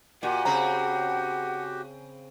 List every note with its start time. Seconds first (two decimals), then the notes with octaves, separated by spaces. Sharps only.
0.23 A#2 F#4 G4 F#5
0.45 C#3 C4 A#5